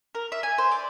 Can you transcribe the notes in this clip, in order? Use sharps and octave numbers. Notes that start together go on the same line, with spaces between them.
A#4
E5
G#5
C5
D5